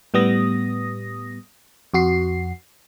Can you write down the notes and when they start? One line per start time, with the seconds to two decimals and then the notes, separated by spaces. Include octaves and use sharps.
0.14 A2 G3 B3 D#6 A#6
1.94 F2 F#4 C7